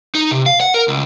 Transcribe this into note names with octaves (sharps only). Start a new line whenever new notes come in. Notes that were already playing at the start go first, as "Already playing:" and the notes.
D#4
C3
F5
F#5
A#4
C#2